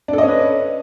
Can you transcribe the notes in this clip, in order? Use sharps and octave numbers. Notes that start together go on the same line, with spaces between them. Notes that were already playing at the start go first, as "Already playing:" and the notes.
C#4 D4 A4 B4 D#5